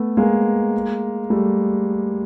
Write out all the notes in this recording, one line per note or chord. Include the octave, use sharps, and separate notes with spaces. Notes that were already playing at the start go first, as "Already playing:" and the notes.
Already playing: A3 B3
G#3 A#3
G3 A3